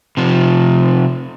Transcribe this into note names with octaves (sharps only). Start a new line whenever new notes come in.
C3 F3